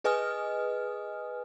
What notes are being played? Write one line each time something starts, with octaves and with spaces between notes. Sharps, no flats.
G#4 B4 D#5 G#5 D#6 F6